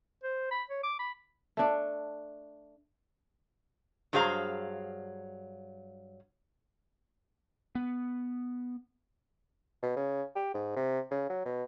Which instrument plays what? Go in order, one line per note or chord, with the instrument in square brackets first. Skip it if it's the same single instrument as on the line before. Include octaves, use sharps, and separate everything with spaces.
[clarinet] C5
B5
C#5
D6
B5
[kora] A3 D4
[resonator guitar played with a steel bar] G2 F#3 G#4 C5 F5 A#5
[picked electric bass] B3
[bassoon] B2
C#3
G4
G#2
C3
C#3
F#3
B2